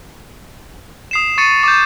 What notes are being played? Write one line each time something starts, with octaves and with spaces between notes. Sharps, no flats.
D#6 C7 E7
C#6 A6 C#7 D#7
D6 G6